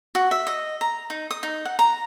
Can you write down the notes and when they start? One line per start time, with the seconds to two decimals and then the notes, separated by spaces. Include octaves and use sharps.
0.15 F#4
0.31 E5
0.47 D#5
0.81 A#5
1.10 D#4
1.31 D#6
1.43 D#4
1.65 F#5
1.79 A#5